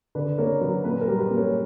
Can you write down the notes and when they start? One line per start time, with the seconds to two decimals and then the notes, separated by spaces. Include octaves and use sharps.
0.15 D3 B4 D5
0.38 A#3 A#4 C#5
0.61 F#3 B4
0.84 A#2 B4
1.01 A#4
1.08 G3
1.19 B4
1.30 A#2
1.36 A#4 C#5